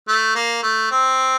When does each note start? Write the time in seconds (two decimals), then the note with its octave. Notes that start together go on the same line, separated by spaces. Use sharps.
0.08 A3
0.35 A#3
0.63 A3
0.91 C4